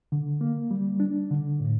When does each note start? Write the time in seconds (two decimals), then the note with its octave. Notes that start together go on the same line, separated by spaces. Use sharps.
0.12 D3
0.41 A#3
0.71 G3
1.00 D4
1.30 D3
1.60 A2